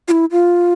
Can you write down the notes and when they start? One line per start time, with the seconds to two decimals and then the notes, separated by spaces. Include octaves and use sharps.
0.08 F4
0.11 E4
0.31 F4